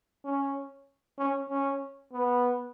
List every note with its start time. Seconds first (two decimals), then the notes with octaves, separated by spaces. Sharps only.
0.25 C#4
1.19 C#4
1.50 C#4
2.13 B3